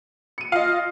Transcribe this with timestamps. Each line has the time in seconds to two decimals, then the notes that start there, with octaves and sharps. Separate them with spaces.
0.38 C#7 D#7
0.52 F4 D#5 F5